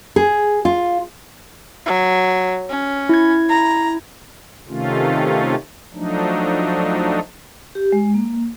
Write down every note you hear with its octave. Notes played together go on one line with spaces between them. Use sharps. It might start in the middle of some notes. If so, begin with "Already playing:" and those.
G#4
F4
F#3
C#4
E4 G#6
A#5
C3 D#3 A3 C#4 F4
F3 F#3 A3 D4 D#4
G4
G#3
A#3